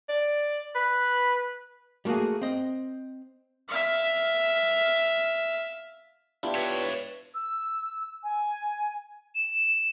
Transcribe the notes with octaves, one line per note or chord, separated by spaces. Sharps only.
D5
B4
G3 A3 A#3 F#4 G#4
C4 D#5
E5 F5
B3 D4 E4 F4 G4
B4 C#5 E5
E6
G#5
E7